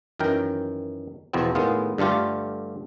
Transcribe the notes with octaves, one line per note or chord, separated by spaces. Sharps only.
F#2 D#3 E3 A#4 G5
E2 B2 F3 B3 C4
A2 D#3 G#3 B3 F4
G2 D3 A3 F4 G4